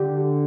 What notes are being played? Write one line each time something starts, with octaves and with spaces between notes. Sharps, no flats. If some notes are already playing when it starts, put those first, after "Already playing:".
Already playing: D3 G4